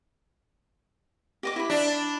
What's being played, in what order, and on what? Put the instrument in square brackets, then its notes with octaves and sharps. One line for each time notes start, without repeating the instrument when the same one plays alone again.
[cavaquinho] G4 D#5 D6
E4 B5
[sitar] D4